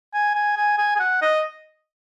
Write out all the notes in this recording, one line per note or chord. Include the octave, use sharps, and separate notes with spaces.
G#5
G#5
G#5
G#5
G#5
F#5
D#5